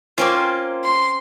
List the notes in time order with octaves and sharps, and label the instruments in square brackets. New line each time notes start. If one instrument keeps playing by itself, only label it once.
[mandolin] A#3 F4 [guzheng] C4 C#4
[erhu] C6